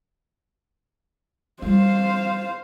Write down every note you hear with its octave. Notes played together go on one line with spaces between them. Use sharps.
G3 F4 C5 F5